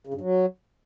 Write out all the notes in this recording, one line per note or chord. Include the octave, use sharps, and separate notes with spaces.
C#3
G2
F#3